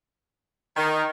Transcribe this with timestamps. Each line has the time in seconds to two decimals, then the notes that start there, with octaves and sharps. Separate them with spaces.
0.77 D#3